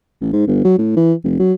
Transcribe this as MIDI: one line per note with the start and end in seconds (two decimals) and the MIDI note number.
0.21 0.33 33
0.33 0.47 44
0.47 0.60 31
0.65 0.77 54
0.78 0.94 45
0.96 1.13 52
1.24 1.37 29
1.40 1.53 54